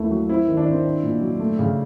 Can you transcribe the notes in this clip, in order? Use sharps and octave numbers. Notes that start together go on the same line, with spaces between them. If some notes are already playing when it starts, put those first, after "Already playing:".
Already playing: D#2 A3 E4
F#3
C4 E4
D#3
D4
D#3 C4
D4
A#2
F#3
A3
C#3